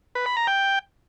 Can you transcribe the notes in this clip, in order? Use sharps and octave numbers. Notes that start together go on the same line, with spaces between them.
B4
B5
A#5
G5